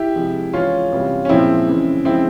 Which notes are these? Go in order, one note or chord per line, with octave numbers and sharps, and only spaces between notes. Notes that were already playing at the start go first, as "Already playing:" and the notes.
Already playing: E4 G4
C3 F3 G#3
C#3 E3 G#3 C#4 F4
C3 E3 G3
C#4
A#2 F3 G#3 C4 E4
C#3 E3 G#3
C#3 F3 G#3 C4 E4